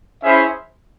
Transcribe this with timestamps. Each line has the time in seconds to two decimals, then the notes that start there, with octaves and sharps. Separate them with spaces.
0.23 C#4 E4 G#4 C5 E5